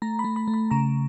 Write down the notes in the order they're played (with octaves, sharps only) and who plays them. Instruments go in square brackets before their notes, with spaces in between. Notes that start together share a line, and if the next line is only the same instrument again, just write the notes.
[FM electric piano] A3 A#5
B5
A3
B5
A3
B5
C#3 A#5